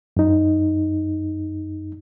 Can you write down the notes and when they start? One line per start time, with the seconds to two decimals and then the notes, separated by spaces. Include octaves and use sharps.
0.17 F#2 D#4